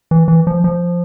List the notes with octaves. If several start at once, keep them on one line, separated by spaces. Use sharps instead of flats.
E3
E3
F3
F3